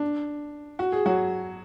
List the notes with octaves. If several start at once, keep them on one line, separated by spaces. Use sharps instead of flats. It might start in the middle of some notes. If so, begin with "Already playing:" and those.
Already playing: D4
F#4
G#4
F#3 F#4